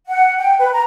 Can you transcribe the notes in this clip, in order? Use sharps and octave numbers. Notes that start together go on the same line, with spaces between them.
F#5
G5
B4
A#5